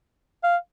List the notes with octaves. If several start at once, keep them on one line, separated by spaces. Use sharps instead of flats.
F5